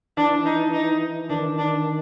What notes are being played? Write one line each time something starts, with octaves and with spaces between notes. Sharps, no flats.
E3 D4
D#4
D#4
D#3 D4
D4